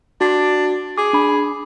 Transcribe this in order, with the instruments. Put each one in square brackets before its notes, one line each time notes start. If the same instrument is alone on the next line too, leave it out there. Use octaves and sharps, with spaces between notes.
[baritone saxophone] D4 [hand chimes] F#4
[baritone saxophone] G#4 [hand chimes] D6
[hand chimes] D4 B5